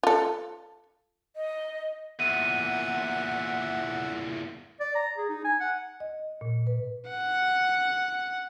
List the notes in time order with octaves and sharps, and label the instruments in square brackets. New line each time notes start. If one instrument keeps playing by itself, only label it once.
[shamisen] F4 A4
[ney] D#5
[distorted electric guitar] E2 A#2 [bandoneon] E5 F#5 [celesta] D#7
[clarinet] D5
A#5
G#4
D#4
G#5
F#5
[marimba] D#5
A#2
B4
[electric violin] F#5